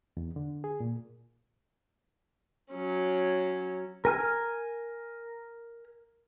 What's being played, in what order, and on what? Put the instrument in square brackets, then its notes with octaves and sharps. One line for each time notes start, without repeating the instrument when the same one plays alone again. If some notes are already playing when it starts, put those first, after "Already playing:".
[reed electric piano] E2
D3
G#4
A#2
[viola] F#3 C#4
[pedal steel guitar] A#4 G#5 F6